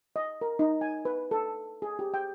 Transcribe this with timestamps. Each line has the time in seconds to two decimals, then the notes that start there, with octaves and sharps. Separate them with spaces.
0.16 D#5
0.41 A#4
0.59 D#4
0.81 G#5
1.05 B4
1.31 A4
1.82 G#4
1.99 G4
2.14 G5